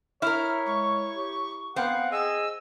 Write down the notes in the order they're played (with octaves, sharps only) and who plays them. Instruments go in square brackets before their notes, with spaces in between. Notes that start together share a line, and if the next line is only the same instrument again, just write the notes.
[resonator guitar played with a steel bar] E4 A#4 [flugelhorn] C#5 [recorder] F6
[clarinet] G#3 [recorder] C#6
[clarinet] G4
[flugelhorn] B3 [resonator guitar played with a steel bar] C4 [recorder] F5 [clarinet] F#5
[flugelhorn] G#4 [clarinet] D#5 [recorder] E6